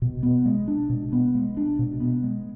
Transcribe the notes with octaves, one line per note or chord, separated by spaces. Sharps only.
B2
B3
G#3
D4
B2
B3
G#3
D4
B2
B3
G#3